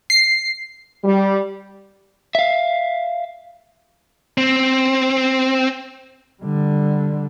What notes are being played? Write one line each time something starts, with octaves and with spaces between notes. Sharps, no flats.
C7
G3
E5 F5
C4
D3 G3